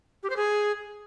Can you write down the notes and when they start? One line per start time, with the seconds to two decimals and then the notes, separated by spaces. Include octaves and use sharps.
0.23 G4
0.30 C5
0.37 G#4